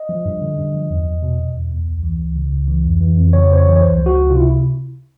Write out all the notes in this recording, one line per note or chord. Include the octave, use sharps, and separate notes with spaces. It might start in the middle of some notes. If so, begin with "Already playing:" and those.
Already playing: D#5
F3
G2
D3
G2
F3
E2
E2
B2
B2
E2
E2
C#2
E3
C#2
C#3
C#2
E3
F2
E3
F2
C#3 C#5
F2 C5
C#5
E3
C#5
C#2 C5
F3
F#4
C#2
C3 F4
E4